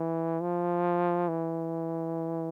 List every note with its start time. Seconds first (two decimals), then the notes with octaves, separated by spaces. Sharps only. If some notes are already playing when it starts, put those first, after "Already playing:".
Already playing: E3
0.41 F3
1.29 E3